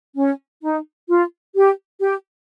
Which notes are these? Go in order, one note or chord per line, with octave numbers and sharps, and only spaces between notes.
C#4
D#4
F4
G4
G4